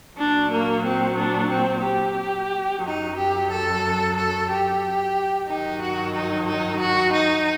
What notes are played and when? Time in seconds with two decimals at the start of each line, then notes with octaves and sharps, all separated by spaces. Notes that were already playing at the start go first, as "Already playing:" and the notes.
0.18 A#2 F#3 D4
0.51 A#3
0.85 C4
1.18 D4
1.50 C4
1.84 G4
2.83 F#2 F#3 D#4
3.17 G4
3.49 A4
4.16 A4
4.49 G4
5.48 G2 D#3 F#3 D#4
5.82 F#4
6.15 D#4
6.49 D#4
6.81 F#4
7.14 D#4